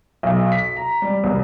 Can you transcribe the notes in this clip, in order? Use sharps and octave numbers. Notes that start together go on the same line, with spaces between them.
B1
B6
A#5
G3
C2